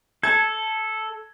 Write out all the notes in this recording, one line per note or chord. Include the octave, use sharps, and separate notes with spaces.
A4 A5 G#6